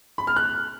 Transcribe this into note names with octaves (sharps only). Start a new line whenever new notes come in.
B5
F6
F#6